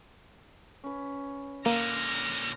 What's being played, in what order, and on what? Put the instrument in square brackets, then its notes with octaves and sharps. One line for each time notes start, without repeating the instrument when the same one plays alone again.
[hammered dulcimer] C#4 B4
[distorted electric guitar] A#2 D3 [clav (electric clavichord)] A#3 [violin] F6 A#6